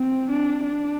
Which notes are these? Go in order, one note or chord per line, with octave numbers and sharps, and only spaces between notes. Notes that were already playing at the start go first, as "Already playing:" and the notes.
Already playing: C4
D4
D4